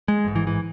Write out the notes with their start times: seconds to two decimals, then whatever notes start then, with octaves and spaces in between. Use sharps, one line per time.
0.08 G#3
0.25 A1 G#2
0.36 E3
0.47 E3